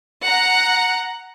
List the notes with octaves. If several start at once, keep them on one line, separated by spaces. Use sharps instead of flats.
F#5 A#5